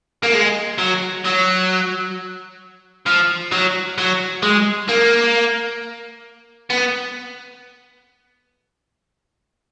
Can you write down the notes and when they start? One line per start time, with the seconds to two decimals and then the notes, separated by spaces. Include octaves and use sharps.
0.23 A#3
0.34 G#3
0.79 F#3
1.25 F#3
3.06 F3
3.52 F#3
3.98 F#3
4.43 G#3
4.89 A#3
6.70 B3